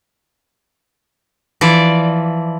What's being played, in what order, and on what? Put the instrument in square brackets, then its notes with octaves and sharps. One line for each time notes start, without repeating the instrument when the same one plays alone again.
[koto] E3 F3 D5